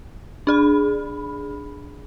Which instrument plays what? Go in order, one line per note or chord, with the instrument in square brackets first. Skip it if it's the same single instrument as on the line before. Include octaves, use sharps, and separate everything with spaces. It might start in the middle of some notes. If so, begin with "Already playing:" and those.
[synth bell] D4 G#4 B5